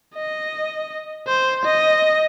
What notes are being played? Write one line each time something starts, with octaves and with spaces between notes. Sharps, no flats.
D#5
C5
D#5